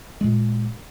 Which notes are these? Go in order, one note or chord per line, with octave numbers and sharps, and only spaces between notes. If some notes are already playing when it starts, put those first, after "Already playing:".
A#2 G#3